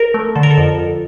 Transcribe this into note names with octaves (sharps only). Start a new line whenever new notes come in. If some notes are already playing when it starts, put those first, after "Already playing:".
Already playing: A#4
A3
D3 A4
A#4
A4
F2
F2